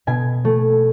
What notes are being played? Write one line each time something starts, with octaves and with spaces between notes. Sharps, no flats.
B2 G#5
A3